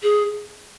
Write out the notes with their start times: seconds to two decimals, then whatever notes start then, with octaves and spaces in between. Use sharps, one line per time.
0.03 G#4